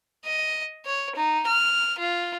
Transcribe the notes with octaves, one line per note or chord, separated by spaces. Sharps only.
D#5
C#5
D#4
F6
F4